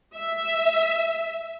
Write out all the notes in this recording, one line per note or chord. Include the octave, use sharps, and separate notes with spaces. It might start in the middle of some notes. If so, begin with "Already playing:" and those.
E5